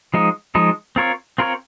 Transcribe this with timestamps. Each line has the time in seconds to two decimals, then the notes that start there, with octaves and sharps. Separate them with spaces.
0.14 F3 G#3 D#4
0.55 F3 G#3 D#4
0.96 C4 F4 A#4 C#5
1.38 C4 F4 A#4 C#5